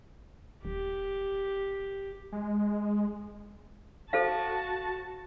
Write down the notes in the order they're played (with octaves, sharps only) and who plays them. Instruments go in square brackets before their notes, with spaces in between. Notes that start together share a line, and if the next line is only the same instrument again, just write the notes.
[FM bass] D#1 [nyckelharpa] G4
[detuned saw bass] G#3
[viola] F#4 A5 [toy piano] A4 C5 F5